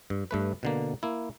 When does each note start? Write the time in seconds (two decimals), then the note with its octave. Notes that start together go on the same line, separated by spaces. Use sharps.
0.10 G2
0.31 G2 A3 B4
0.63 B2 D3 A#3
1.03 A#3 E4